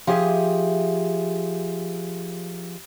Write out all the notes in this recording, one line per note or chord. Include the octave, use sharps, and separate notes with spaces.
F3 G4 G#4 E5